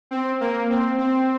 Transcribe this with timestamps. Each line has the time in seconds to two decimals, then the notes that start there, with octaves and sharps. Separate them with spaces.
0.11 C4
0.40 A#3
0.70 C4
0.98 C4